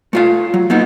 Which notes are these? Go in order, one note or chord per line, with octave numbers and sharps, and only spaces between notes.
A3 F4 F5
F#3
F#3 A#3 B3 D#4